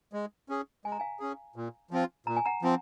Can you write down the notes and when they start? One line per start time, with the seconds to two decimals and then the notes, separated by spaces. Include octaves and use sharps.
0.13 G#3
0.49 C#4 G#4
0.85 G#3 G#5
0.92 A#5
1.00 F5 G#5
1.20 C#4 G#4
1.56 A#2
1.91 F3 C4 F4
2.27 A#2 A#5
2.37 G#5
2.46 F#5 A#5
2.62 F3 C4